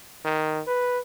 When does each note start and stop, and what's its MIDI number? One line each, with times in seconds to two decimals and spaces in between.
0.25 0.62 51
0.67 0.99 71